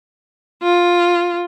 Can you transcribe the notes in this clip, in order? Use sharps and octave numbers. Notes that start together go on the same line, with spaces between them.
F4